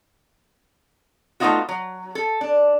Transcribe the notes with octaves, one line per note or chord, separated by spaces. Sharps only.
A3 B3 C#4 D#4 F4 F#4
F#3
A4
D4